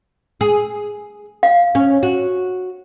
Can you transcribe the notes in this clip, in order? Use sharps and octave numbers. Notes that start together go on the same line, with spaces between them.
G#4
F5
C#4
F#4